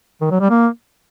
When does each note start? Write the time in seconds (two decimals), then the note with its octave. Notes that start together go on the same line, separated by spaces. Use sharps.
0.21 D#3
0.31 F#3
0.40 G3
0.50 A#3